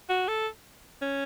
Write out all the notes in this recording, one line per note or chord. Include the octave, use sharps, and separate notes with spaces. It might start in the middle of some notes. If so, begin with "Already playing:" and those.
F#4
A4
C#4